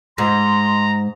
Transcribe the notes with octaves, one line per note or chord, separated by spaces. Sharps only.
G#2 A#5 C6